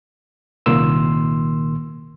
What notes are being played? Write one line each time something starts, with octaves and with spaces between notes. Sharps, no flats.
C2 A#2 D#3 A#3 C6 E6